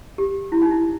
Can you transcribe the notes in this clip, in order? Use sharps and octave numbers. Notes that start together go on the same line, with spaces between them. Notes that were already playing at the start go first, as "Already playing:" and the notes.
G4
E4
D#4
E4